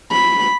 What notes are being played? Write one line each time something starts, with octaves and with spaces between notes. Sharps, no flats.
B5